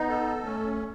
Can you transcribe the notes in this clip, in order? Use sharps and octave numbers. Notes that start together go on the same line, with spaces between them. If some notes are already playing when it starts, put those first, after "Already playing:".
Already playing: B3 D#4
A4
A3 C#4